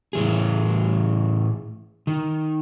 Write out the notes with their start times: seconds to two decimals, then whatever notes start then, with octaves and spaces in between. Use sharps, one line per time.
0.13 A2 E3 G#4
2.07 D#3